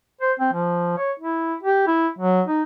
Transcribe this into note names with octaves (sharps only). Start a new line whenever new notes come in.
C5
C4
F3
C#5
E4
G4
E4
F#3
D#4